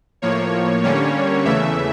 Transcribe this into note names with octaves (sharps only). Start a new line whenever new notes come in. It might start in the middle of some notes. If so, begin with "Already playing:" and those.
A2 F3 A#3 C#5
D3 G3 A#3 C#4 C#5
E2 C#3 E3 A3 E5